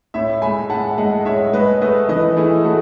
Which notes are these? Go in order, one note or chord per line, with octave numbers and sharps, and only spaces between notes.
A2 C#5 E5
G#3 G#5 B5
A2 F#5 A5
G#3 D#5 F#5
A2 C#5 E5
G#3 B4 D#5
A3 B4 D#5
E3 B4 D#5
A3 E4 G#4
A3 F#4 A4